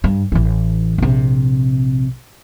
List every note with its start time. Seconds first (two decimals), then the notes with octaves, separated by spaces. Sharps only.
0.04 G2
0.32 A1 E3
0.98 A#1 C3